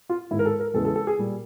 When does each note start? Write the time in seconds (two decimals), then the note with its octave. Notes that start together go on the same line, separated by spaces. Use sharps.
0.09 F4
0.31 G#2 D#3 G#3 E4
0.39 A#4
0.45 A4
0.60 A#4
0.74 E2 C#3 E3 G#3 A4
0.85 A4
0.96 A4
1.07 G#4
1.18 A#2 G3